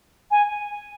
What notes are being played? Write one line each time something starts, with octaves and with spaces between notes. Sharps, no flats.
G#5